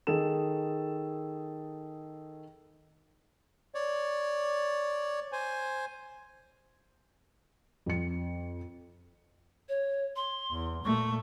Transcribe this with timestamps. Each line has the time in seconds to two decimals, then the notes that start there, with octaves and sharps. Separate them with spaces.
0.07 D#3 G#4 A4 E7
3.75 C#5 D5
5.32 C5 G#5
7.86 F2 C#7
9.69 C#5
10.16 C6
10.51 E2
10.84 A#2 A3 C#6